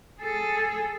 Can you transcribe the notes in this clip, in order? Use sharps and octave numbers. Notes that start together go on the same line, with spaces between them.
G#4 A4